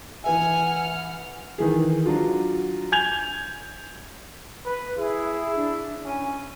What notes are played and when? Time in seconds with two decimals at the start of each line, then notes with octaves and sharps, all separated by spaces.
0.24 E3 B4 E5 F#5 G#5 F6
1.58 D#3 E3 G#4
2.06 F#3 D4 F4
2.92 G#5 G6 G#6 F7
4.65 B4
4.97 E4 G#4
5.56 D4
6.05 C#4 G#5